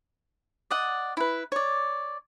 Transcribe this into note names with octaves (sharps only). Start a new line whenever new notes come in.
D5 D#5 F#5
E4 B4
C#5 D5